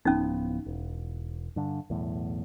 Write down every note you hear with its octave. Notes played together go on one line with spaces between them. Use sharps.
D1 F3 B3 C#4 D#4
E1
G2 D3
B1 E2 A2